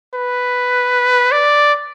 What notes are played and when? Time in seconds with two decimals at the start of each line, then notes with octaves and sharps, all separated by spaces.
0.15 B4
1.32 D5